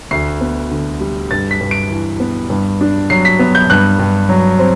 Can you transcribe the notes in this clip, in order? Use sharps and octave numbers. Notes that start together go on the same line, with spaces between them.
D2 C7
B3
D3
G3
G2 A6
B6
G2
D7
E3
B3
G2
D4
F#3 C7
B6
B3
G6
G2 F#6
G2
F#3
C4